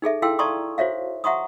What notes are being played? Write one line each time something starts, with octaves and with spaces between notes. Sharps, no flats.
D#4 G#4 A4 E5
E4 A4 F5 G5 C6 E6
D5 A5 A#5 C6 C#6 D#6
F#4 C5 C#5 E5 F5
E5 F#5 A#5 C6 C#6 D#6